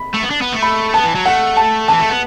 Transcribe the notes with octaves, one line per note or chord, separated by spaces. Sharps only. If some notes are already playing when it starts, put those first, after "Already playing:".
Already playing: B5
A3
B3
D4
B3
A3
B5
B3 A5
E3
F#3
A3 F#5
A5
E3 A5
A3
B3